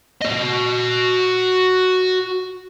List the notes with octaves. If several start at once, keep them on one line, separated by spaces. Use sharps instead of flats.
F#4 D#5